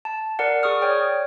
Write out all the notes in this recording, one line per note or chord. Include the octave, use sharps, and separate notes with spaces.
A5
A#4 D5 F#5
G#4 C#6 D#6 F6
C#5 D5 G5